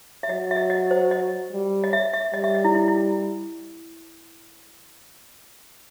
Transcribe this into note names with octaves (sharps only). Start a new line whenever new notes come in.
E5
F#3 D#5
E5
D#5
D#5
C5
D#5
G3
D#5
E5
E5
G3 D#5
E5
D#5
E4
E4
E4